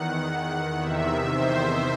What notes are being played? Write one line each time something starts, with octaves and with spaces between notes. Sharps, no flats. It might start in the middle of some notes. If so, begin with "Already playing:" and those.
Already playing: E2 D#3 F#5
F#5
E2 C3 D#3 E5
C5